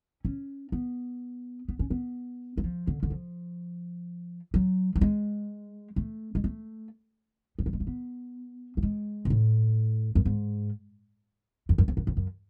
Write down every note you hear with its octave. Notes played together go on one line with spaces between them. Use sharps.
C#4
B3
B3
C#4
B3
F#3
F3
D3
D3
F3
F#3
F#3
G#3
A3
G#3
A3
F3
F#3
G#3
A3
B3
A3
G#3
B2
A2
F#2
G#2
F2
F#2
F2
F#2
F2
F#2